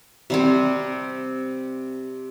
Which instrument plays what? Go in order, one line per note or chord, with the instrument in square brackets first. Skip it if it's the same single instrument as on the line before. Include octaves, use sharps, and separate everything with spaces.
[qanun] C3 G3 C4